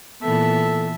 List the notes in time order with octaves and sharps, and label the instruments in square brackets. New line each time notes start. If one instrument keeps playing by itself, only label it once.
[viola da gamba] A#2 E3 B3 [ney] A4 [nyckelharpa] E5 A5